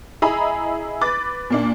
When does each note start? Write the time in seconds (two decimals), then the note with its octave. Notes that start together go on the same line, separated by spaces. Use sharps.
0.22 E4 G#4 D#5 A#5 B5
1.01 B4 D6 A6
1.50 A#2 A#3 D4